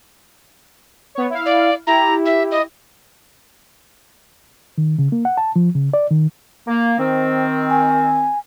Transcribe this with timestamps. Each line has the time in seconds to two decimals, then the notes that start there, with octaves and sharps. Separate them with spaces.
1.15 B3 C#5
1.30 E4 F5
1.46 D5
1.87 E4 G4 A#5
2.25 E5
2.51 D#5
4.78 D#3
4.99 C#3
5.12 A#3
5.25 F#5
5.37 A5
5.56 F3
5.75 C#3
5.94 D5
6.11 D#3
6.68 A#3
6.99 D#3 C4 C5
7.70 G#5